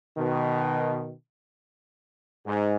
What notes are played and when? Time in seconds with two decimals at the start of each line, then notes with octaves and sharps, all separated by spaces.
0.16 B2 D#3
2.46 G#2